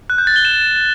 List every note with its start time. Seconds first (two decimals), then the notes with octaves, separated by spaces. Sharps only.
0.10 F#6
0.18 G6
0.27 A6
0.36 G7
0.45 E7